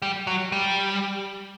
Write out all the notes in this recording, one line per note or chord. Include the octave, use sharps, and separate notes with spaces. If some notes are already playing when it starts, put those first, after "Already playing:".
G3
F#3
G3